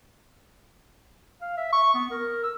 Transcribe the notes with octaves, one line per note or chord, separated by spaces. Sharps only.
F5
E5
C#6
B3
A#4
E6